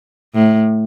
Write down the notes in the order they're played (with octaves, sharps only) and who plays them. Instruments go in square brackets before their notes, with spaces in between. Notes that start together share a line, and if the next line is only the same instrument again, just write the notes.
[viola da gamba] A2